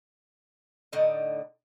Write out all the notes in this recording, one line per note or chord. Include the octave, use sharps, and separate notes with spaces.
A2 D3 D#4 D#5